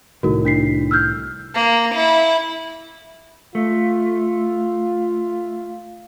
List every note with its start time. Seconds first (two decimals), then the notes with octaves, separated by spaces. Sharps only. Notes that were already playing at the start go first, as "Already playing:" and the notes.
0.23 C2 A2 D#3 F#4 A#4
0.45 D4 B6 C7
0.91 E6 F6 G6
1.55 A#3
1.95 E4
3.55 A3 F4